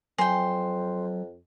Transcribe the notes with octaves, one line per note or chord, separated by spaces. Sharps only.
F2 F#3 C5 G5 G#5